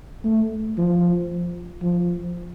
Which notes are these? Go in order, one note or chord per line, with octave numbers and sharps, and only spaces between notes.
A3
F3
F3